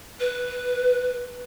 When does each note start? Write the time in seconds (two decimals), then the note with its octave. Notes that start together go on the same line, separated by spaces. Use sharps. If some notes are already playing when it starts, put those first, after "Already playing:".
0.20 B4